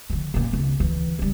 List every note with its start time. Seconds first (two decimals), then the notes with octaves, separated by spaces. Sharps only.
0.10 D3 F3
0.34 F#2 A#2
0.53 E1 C#2
0.80 D2 E3
1.19 C#2 G3